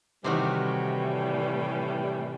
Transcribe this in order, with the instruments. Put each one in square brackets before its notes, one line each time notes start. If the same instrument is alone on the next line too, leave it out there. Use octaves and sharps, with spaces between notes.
[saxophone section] A2 E3 G3 [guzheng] C3 D#3 F#4